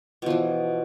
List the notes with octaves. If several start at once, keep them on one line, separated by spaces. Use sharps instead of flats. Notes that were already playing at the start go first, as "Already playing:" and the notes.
B2 E3 F3